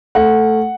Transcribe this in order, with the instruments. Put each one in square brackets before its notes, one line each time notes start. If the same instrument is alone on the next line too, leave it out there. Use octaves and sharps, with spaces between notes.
[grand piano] A3 F#5